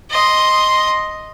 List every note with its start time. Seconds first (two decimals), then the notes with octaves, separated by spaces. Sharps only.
0.11 D#5 C6